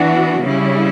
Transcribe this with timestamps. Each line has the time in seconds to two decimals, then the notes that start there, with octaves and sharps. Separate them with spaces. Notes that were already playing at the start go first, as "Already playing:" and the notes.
Already playing: E3 B3 D4 F#4
0.42 C#3 G3 C#4 E4